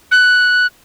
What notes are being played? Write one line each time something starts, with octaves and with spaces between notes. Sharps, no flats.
F#6